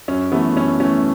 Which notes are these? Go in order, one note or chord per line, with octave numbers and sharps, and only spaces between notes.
F#2 C#4
E3 A3 B3
F#2 C#4
E3 A3 C#4